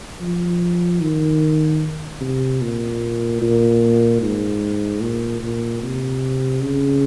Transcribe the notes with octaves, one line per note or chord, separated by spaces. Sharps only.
F3
D#3
C3
A#2
A#2
G#2
A#2
A#2
C3
C#3